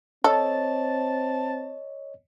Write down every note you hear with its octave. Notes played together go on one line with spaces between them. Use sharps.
C4 A4 C#5 D#5 A5